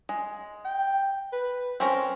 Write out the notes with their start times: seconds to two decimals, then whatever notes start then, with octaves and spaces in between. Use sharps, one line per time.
0.09 G#3
0.65 G5
1.33 B4
1.80 C4 C#4 A#4 C5